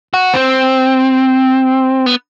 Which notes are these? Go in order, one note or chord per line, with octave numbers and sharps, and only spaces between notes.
F#4
C4
B3